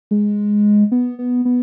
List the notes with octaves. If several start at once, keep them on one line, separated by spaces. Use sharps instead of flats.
G#3
B3
B3
B3